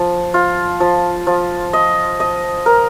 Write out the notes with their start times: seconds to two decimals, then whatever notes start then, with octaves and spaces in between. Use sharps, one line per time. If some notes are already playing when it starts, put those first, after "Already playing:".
Already playing: F3
0.34 F4
0.80 F3
1.27 F3
1.73 D#5
2.20 D#5
2.66 A#4